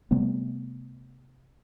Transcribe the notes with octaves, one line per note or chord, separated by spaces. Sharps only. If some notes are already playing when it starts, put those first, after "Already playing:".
C3 G3 A3 B3